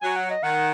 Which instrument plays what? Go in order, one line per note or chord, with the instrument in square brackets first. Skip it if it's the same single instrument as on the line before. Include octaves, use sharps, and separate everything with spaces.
[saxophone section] F#3 [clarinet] G#5
[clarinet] F#5
D#5
[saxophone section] D#3 [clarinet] F#5